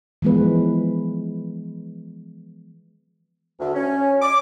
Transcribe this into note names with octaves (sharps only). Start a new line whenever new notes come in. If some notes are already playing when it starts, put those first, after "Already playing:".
E3 F3 G#3 B3 B4
D2
C#4
D6